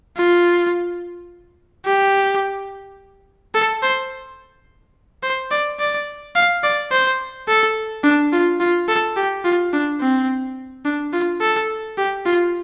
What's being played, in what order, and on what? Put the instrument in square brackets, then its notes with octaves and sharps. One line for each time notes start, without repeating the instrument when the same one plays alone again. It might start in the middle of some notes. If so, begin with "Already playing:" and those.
[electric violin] F4
G4
A4
C5
C5
D5
D5
F5
D5
C5
A4
D4
F4
F4
A4
G4
F4
D4
C4
D4
F4
A4
G4
F4